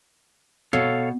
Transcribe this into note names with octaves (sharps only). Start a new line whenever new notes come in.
B2 A4 C#5 F5